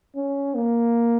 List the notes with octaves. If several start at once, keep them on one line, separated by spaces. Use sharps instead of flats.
C#4
A#3